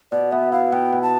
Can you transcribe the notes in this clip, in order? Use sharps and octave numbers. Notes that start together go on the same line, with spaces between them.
B2 D5
B3 E5
E4 F5
B2 G5
B2
A5